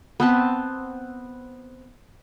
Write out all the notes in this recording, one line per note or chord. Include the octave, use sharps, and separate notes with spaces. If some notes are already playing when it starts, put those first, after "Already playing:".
B3 C4 A5